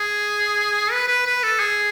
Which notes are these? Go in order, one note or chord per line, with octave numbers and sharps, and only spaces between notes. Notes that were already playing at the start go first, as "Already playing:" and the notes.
Already playing: G#4
B4
B4
B4
A4
G#4